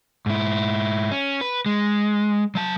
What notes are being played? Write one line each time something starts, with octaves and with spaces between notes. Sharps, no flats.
G#2 E4
C#4
B4
G#3
F#3 A5